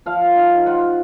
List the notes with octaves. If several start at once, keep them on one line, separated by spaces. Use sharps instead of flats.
F3 F5
D#4
F4 F#5